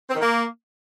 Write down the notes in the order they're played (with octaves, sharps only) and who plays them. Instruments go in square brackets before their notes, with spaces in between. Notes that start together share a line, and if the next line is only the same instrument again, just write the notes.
[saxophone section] C4
D#3
A#3